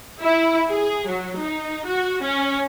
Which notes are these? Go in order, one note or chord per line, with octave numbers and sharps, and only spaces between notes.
E4
G#4
F#3
D#4
F#4
C#4